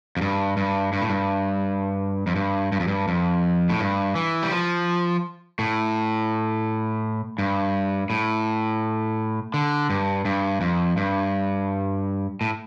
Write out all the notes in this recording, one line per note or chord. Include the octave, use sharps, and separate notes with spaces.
F2
G2
G2
G2
A2
G2
F2
G2
G2
F2
G2
F2
A2
G2
E3
G3
F3
A2
G2
A2
D3
G2
G2
F2
G2
A2